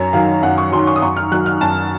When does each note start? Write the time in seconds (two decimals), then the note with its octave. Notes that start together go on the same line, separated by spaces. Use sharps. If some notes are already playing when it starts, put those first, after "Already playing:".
Already playing: F#2 C#5
0.13 D#3 F#3 F5
0.43 F#2 F#5
0.58 C#6
0.72 D#3 F#3 C6
0.87 C#6
0.96 D#6
1.02 F#2 C#6
1.17 F6
1.32 D#3 F#3 F#6
1.46 F6
1.61 F#2 A5